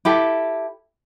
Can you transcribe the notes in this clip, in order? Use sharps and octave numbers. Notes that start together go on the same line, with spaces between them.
E4 G4 A4